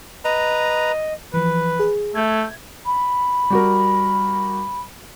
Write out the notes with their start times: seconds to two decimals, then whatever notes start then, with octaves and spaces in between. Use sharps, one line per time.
0.24 B4 D#5 A#5
1.34 E3 F3 B4
1.80 G#4
2.15 A3 E5 G6 G#6
2.86 B5
3.50 G3 F#4 A#4